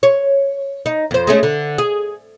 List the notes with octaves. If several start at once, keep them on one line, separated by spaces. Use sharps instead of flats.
C#5
D#4
F2 C5
G#3 A3 C#4
D3
G#4